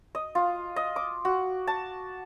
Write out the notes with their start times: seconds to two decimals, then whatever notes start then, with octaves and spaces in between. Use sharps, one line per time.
0.15 D#5
0.35 F4
0.76 D#5
0.96 D6
1.25 F#4
1.67 A5